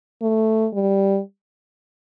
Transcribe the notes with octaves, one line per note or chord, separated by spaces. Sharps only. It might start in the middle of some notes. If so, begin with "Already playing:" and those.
A3
G3